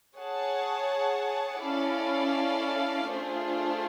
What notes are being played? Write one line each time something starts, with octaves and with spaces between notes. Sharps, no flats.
G#4 C#5 F#5 A5
C#4 E4 A4 D5 F5
A3 D4 F4 G#4 C5